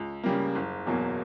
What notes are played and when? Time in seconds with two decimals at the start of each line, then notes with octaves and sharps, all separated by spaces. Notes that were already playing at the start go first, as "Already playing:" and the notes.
Already playing: C#2
0.24 C#3 G3 A#3
0.55 F#1
0.87 E2 B2 F#3 A#3